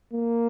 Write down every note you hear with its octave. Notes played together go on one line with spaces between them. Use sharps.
A#3